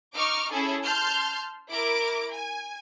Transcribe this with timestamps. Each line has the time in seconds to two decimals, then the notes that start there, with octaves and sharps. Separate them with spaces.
0.15 D#4 C#6 D6 F6
0.51 C#4 E4 G#4 A4
0.82 A5 C6 F6 G6
1.69 E4 A#4 D6 D7
2.30 G#5